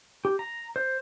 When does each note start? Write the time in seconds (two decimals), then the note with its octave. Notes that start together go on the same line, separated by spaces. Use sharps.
0.25 G4
0.39 A#5
0.76 C5